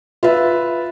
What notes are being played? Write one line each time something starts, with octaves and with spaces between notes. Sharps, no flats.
F4 B4 E5